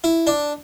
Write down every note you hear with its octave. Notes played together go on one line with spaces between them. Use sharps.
E4
D4